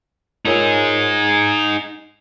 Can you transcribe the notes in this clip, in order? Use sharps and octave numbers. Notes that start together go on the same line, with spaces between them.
D#4 F4 G#4 A#4 C#5
C7